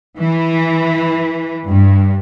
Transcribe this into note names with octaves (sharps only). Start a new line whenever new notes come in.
E3
G2